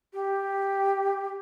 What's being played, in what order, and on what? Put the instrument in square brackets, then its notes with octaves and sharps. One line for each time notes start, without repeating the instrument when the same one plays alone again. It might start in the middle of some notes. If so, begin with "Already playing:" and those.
[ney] G4